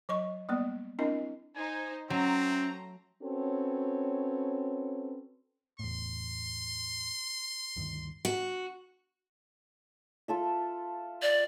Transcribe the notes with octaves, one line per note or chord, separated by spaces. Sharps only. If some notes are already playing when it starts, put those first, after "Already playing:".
F#3 D#5 C#6
G3 A#3 B3 D5
C4 D4 E4 A#4 D#5
D#4 C5 G#5
F#3 A3 C4 C#4 A#5
C4 C#4 F#4 A4 B4 C#5
E2 A2 C6
D2 G2 D#3
F#4
F4 A4 E5
D5